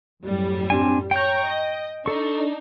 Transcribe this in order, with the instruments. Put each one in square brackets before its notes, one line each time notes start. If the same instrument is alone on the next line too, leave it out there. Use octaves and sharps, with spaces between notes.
[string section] F#2 A2 G3
[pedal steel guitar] C4 D4 G#5
[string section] C#5 A#5 C#6 [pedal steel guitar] G5 G6
[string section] D#5
[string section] D4 D#4 [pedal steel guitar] A4 C#6